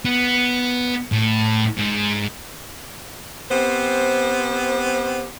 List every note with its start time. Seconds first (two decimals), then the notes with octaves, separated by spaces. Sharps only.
0.05 B3
1.12 A2
1.77 G#2
3.51 B3 C4 G4 C5